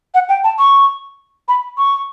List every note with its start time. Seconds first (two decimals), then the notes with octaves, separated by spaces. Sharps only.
0.14 F#5
0.29 G5
0.44 A5
0.59 C#6
1.48 B5
1.78 C#6